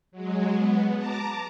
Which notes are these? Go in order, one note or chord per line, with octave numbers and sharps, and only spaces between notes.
F#3 G#3
B3
A5 A#5 D6